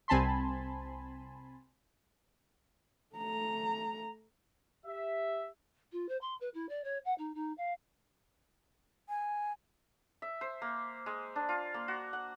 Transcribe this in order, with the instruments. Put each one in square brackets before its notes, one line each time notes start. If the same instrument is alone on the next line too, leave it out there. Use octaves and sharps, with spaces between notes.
[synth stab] C2 C4 G#5 A5 B5 C6
[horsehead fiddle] A3 A#5
[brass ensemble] G4 E5
[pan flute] F4
C5
C6
B4
E4
D5
C#5
F#5
D#4
D#4
F5
[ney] G#5
[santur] E5
C5
A#3
G#3
D4
F4
A#3
F#4
F#5